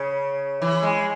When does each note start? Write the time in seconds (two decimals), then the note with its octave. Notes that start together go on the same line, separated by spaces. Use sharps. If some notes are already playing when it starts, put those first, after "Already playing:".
Already playing: C#3
0.62 E3
0.83 G#3